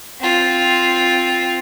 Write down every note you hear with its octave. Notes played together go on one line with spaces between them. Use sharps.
C4 F4